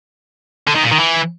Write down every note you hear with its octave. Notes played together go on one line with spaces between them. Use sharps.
D3
D#3
A#2
D#3
E3